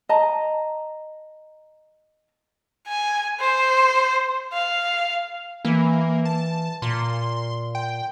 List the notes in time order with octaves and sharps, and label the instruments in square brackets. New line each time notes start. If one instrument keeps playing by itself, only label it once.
[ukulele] D#5 A5 A#5
[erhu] G#5
C5
F5
[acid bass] E3 [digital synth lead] A#3
[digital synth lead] A5
[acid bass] A#2 [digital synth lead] C6
[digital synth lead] G5